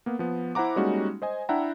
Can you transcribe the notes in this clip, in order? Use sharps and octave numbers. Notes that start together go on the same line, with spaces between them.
A#3 B3
F3 B3
E4 C5 F#5 A#5 D6
G3 G#3 A#3 C#4 D#4 F#4
C5 D#5 G#5
D4 E4 E5 F#5 G5 A#5